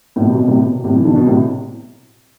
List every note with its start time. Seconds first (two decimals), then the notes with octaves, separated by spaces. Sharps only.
0.16 A2
0.20 B2
0.28 C3
0.35 B2
0.48 A2 C3
0.63 B2
0.84 A2 C3
0.95 E3
1.05 B2 D3
1.16 B2
1.26 A2 C3